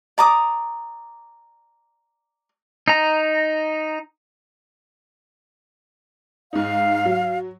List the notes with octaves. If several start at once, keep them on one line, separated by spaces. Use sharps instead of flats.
D5 A#5 D6 D#6
D#4 A#5
G#2 D#4 F5
F#3